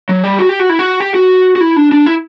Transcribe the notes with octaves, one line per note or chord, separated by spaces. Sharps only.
F#3
G3
F#4
G4
F#4
E4
F#4
G4
F#4
F#4
E4
D4
D4
E4